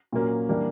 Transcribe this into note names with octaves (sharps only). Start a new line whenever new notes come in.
A#2 F#3 A#3 C#4
E3 G3 A#3 D4